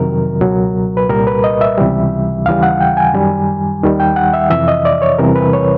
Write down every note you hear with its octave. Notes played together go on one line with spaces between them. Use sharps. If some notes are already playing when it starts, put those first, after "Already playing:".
Already playing: F2 C3 D#3 F#3 A#4
C#2 B2 F#3
B4
C2 A#2 G3 A#4
B4
D#5
E5
C#2 C3 E3 G3
D#2 C#3 E3 G3 F5
F#5
G5
G#5
F#2 D#3 G3
D#2 D#3 G3
G5
F#5
E5
F2 C3 E3 E5
D#5
D5
C#5
E2 C3 E3 G3 A#4
B4
C#5